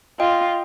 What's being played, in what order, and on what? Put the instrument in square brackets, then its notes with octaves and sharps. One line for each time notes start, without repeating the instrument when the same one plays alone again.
[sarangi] F4 [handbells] D#5 G5